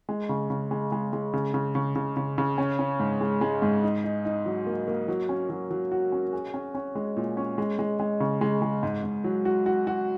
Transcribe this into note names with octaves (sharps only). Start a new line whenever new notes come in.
G#3
C#3
C#3
G#3
G#3
G#3
C#3
C#3
C#3
C#3
C#3
C#3
C#4
C#4
G#2
G#3
G#3
G#2
D#4
D#4
D#4
F#3
A#3
A#3
F#3
C#4
F#3
F#3
F#4
C#4
G#4
C#4
C#4
G#3
A#2
C#4
G#3
G#3
G#3
C#3
G#3
G#3
G#2
G#2
F#3
F#4
F#4
F#4